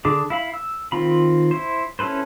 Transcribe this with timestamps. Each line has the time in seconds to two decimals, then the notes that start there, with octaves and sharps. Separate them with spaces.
0.05 D3 D4 G#4 D6
0.30 E4 F5 B5
0.54 E6
0.92 D#3 C4 F4 B5
1.51 E4 C5
1.99 C#4 E4 A4 B4 C5